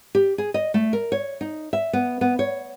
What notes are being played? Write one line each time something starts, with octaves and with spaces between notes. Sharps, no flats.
G4
G#4
D#5
A3
A#4
C#5
D#4
E5
B3
B3
C#5